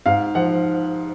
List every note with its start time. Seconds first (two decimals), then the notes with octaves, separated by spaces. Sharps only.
0.06 G#2 F5
0.35 F3 F#5